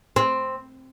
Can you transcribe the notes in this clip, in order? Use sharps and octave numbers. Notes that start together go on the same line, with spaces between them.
C4